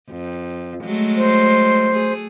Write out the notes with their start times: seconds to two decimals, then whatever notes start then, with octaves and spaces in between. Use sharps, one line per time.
0.10 F2
0.84 F#3 G#3 A3
1.16 C5
1.94 A3 G#4